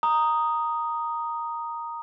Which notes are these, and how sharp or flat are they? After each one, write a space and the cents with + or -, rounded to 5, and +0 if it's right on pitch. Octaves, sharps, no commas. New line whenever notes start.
A#5 +0 D#6 +0